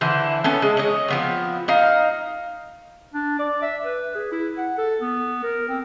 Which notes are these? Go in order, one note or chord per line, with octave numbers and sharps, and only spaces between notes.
D3 E3 E4 C5
B3 C#4 A4
G#3
C#5 D#5
F3 B3 C4
D#4 F5 A#5
D4
D5
E5
B4
G#4
E4
F#5
A4
B3
A#4
C4